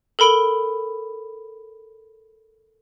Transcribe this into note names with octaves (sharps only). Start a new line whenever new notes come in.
A4 A#4 B5 D7 G7